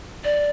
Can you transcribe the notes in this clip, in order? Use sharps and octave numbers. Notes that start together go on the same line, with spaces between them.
D5